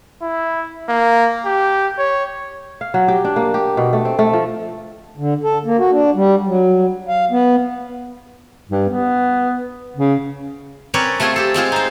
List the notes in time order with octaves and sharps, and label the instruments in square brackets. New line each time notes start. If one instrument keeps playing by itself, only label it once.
[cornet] E4
A#3
G4
C#5
[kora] F5
F#3
G4
D4
A#3
G4
B2
A3
C4
A3
F3
[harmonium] D3
A4
A#3
F#4
D4
G3
F#3
F5
B3
[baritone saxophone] G2
B3
C#3
[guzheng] C4 C#4 A#4 B4 C#5 D5
A3 C4 F4 G#4 G#5 C6
G4 A4
G#3 C4 F4 G#4
D#4 C5